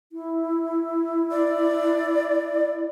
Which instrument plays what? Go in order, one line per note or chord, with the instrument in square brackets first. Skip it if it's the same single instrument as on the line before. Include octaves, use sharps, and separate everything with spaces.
[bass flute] E4
[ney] D5